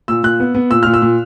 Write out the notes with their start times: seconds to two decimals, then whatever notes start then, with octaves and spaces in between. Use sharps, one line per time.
0.08 A#2 E6
0.23 A#2 F#6
0.40 B3
0.55 B3
0.71 A#2 E6
0.83 A#2 F6
0.94 E6
1.02 A#2